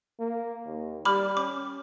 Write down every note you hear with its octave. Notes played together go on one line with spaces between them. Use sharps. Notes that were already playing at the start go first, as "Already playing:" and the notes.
A#3
D#2
G3 B5 D6 F6
C#4 D6